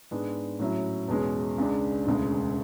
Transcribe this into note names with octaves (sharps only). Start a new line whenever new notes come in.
G#2 G#3 B3 D4
A2 F#3 C#4 E4
E2 B2 G#3 C#4
C#2 C#3 G#3 D4
E1 D2 C#3 G#3